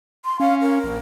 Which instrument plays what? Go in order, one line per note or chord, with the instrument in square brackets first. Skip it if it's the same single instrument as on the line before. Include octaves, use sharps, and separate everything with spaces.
[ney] C6
[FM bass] C#4 [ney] F5
[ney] A#4
[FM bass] A#1